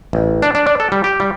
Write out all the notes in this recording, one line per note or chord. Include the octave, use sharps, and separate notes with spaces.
A1
D4
D4
D4
A4
G3
G4
G3